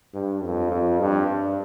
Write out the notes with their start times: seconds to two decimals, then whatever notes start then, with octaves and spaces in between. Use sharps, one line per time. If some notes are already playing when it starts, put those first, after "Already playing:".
0.14 G2
0.44 F2
0.71 F2
1.00 G2
1.27 G2